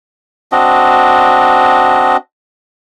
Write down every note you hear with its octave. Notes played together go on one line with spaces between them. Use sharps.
C4 D4 F#4 D#5